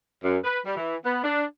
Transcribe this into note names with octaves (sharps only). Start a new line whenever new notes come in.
F#2
B4
G3
E3
B3
D4